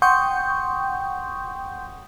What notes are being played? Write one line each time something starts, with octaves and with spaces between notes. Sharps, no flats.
F#5 G5 C6 C#6 D#6 G6